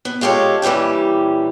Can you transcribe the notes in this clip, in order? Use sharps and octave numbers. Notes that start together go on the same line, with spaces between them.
B3
G#3 F4 G4 A4 C#5
A#2 E3 G3 C#4 G4